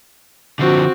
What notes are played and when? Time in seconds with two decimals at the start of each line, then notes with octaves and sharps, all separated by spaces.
0.59 D3 F3 C4 F#4